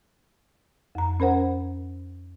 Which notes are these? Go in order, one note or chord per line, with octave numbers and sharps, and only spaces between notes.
F2 A#5
C#4 A#4 C5 F#5